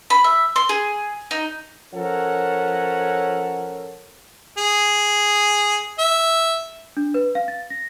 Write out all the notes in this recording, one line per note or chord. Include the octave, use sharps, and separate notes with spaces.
B5
E5
C6
G#4
D#4
F3 C#4 A4 A#4 C#5 F#5
G#4
E5
D4
B4
F5
A6
A#6